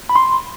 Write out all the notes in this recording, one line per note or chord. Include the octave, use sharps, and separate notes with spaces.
B5
C6